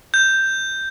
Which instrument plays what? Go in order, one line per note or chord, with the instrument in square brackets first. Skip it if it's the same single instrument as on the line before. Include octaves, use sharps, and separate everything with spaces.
[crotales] G6